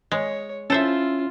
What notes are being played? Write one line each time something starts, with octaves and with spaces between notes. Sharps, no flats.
G#3 C#5
C#4 E4 F4 A4 C5 E5